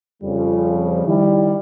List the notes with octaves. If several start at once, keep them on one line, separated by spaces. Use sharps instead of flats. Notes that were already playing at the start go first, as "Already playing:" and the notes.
F2 C#3 F3 G3
D#3 G3 E4